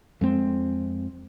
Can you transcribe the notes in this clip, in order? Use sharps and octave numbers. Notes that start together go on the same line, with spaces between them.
F2 G#3 C4